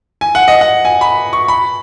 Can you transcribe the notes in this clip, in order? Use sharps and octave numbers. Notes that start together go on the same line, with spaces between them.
G#5
F#5
D#5
F#5
G#5
B5
C#6
B5